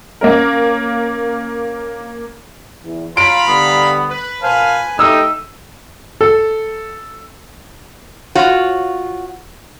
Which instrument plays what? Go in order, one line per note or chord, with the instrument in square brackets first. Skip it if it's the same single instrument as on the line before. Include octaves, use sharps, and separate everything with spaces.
[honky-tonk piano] A#3 C#4 A#4
[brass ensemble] E2
[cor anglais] F4 [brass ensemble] C#5 [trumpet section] F5 A#5 B5 [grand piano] D7
[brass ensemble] D3 G3 [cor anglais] B3
[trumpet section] B4
[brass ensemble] A#2 C5 A5 [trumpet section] B4 G#5 [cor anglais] F5
[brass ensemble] A3 [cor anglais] D#4 [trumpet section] G4 [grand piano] E6
[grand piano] A4
[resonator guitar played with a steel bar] F4 F#4 C#5